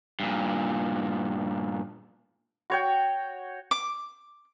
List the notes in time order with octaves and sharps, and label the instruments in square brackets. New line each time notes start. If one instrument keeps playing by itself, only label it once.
[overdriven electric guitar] G2 A#2
[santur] F#4 C#5 G5
[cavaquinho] D6